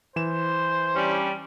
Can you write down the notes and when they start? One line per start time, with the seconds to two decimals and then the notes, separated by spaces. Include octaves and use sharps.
0.16 E3 C5 E7
0.96 G3 C#4 D4